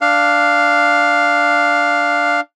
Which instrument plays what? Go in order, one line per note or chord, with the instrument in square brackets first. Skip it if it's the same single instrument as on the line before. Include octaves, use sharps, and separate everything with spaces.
[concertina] D4 F5